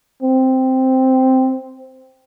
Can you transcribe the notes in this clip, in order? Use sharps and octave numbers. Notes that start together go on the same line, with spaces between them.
C4